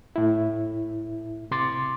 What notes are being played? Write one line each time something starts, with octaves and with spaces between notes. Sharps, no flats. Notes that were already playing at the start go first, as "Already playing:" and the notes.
A2 E4
C3 C6 D6 A6